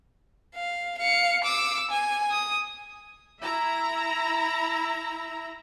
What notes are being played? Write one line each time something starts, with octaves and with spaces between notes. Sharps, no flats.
F5
F5 C#7
D6 E6
G#5
D#6
E4 E5 A#5